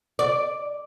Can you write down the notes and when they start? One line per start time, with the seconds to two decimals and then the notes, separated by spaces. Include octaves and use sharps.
0.19 D5